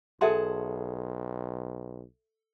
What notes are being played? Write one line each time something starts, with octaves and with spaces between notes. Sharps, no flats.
B1 G#4 A4 E5 F#5 A5 C6